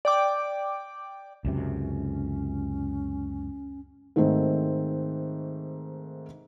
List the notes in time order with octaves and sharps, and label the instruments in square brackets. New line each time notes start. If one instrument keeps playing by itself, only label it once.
[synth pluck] D5 G5 D6
[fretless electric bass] C#2 F#2 C3 [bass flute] C#4
[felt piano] G#2 D#3 A3 C4